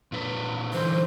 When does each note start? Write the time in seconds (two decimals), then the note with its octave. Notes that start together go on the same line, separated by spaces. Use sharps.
0.12 A#2 D4 B4
0.73 D3 E3 C5